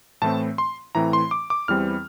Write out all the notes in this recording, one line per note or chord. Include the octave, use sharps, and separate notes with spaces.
A2 E3 A3 C4 A5
C6
A2 E3 A3 C4 A#5
C6
D6
D6
E2 E3 G3 C4 F6